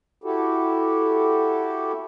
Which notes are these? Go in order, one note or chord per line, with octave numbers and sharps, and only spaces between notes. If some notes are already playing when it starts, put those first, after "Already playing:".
E4 F#4 G4 A4